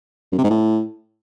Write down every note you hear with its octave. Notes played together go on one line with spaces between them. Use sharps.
F#2
C3
G#2
A2